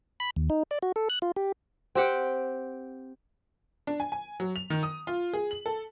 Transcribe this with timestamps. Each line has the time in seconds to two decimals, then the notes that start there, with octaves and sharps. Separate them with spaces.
0.20 B5
0.36 D#2
0.50 D#4
0.71 D5
0.82 F#4
0.96 A4
1.09 F#6
1.22 F4
1.36 G4
1.95 C4 G4 F#5 G5
3.87 D4
4.00 G#5
4.12 G#5
4.40 F#3
4.56 F7
4.70 D#3
4.83 D#6
5.07 F4
5.33 G#4
5.51 F#7
5.66 A4